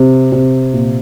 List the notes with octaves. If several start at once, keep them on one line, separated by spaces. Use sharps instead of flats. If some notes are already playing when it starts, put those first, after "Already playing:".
Already playing: C3
C3
A#2